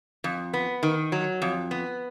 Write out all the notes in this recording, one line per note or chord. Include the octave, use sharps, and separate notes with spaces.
F2
B3
D#3
F#3
F2
B3